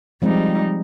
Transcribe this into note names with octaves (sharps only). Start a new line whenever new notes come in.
F3 G3 G#3 C4 D#4